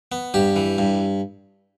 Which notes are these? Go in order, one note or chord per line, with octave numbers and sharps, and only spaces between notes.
B3
G2 G4
E3
G2